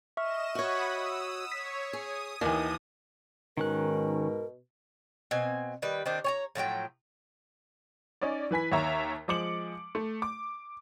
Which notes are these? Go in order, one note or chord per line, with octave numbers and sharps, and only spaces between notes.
D#5 E5 C#6 F6 E7
F#4 C#5 F#5 B5 D#6
D#6 E6
C#5 B6
G#4 D#6
D#2 D#3 E3
G#2 B2 D#3 C#4 A#4 F#6
B2 C4 G#5
D#3 G3 B4
D#3 C4 D4
C#5 G#5 A#5
A2 F3 F#3 G5
C#4 D#4 D5
E3 B4 G#5 B6
D#2 C#5 E5 A#5
F3 G#3 D6 C#7 F#7
A3
D6